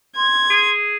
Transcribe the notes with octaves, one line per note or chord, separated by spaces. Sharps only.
C6 G#6
G#4